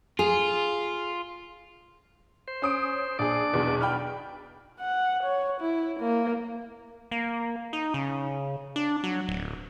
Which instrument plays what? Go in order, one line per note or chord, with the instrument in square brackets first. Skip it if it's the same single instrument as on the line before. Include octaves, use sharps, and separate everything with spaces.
[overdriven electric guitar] F4 [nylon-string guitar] G#4
[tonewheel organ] C5
[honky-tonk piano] C#4 D#6 D7
[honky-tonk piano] A#1 G#4 [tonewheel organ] D4 D5
[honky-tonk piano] B1 E2 B2
G5 B5 F6
[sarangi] F#5
C#5
E4
A#3
[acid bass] A#3
D#4
C#3
D4
F#3
D1